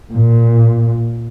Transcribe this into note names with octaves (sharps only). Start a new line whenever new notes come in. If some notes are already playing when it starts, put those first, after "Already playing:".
A#2